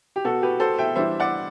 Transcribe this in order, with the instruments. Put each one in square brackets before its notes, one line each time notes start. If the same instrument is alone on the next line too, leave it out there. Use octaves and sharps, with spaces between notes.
[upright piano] G4
B2 F#3 B3 F#4 A4
G4 B4
A4 C5
E5 G5
E3 G3 D4 C5 E5
D5 F#5